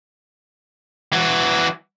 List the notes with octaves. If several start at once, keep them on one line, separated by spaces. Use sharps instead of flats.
E3 F#4